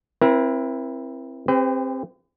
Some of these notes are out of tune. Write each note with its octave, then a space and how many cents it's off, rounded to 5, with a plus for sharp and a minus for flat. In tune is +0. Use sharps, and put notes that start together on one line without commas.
C4 +15 E4 +15 A#4 +45
C4 +15 G4 +40 B4 +45